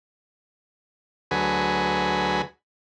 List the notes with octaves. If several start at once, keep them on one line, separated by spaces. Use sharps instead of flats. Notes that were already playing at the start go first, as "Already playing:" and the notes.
D2 F#3 G#4 B4